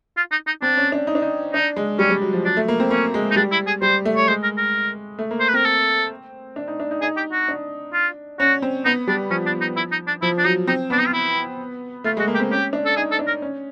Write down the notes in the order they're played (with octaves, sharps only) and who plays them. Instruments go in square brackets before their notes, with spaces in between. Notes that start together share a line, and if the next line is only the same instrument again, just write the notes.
[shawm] F4
D#4
D#4
[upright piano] C4 [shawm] D4
[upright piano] C#4
D4
D#4
D4
D#4
[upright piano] D4 [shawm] D#4
[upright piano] G#3
[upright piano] G3 [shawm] C#4
[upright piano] G3
F#3
F3
[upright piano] F#3 [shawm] D4
[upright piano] A3
A#3
C4
[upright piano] A#3 [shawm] C#4
[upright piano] G#3
[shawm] D#4
[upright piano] G3 [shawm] D4
[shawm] E4
G#4
[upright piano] G3 [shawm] C5
[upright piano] A3
[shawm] C#5
[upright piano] G#3 [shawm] C5
[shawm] A#4
A#4
[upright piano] A3
A#3
[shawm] C5
B4
[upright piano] C4 [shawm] A#4
[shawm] A4
[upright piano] D4
D#4
D4
D#4
[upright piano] D#4 [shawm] G#4
[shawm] G4
F#4
[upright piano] D4
[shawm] F4
[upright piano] C#4 [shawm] F#4
[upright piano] C4
[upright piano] B3 [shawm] D#4
[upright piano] G3 [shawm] D4
[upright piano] F3 [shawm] C#4
[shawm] D4
D#4
E4
D#4
D4
[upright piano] F3 [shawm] E4
[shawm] D4
[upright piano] F#3 [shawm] D#4
[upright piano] C4 [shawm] D#4
[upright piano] B3 [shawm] D4
[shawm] D#4
F4
E4
[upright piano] A3 [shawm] F4
[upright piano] G#3 [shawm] F#4
[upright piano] A#3
[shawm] G4
[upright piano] C4
[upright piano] C#4 [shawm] G4
[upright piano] D4
[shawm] A4
[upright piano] D#4 [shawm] G#4
[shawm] A4
[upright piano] D4
[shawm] A#4
[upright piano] C#4